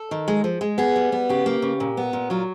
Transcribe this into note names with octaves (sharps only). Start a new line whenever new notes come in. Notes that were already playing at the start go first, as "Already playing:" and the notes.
Already playing: A4
D#3
G#3
F3
G#3
B3 G#4
G3
B3
C#3 G4
A#3
C#3
A#2
B3
A#2
F#3 F4